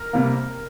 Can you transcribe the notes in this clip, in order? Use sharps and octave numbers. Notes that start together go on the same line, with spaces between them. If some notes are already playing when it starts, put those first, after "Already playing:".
Already playing: A#4
C3 G3 A#3